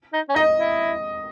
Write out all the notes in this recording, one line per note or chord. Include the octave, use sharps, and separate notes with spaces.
D#4
C#4
D#4 D#5
E4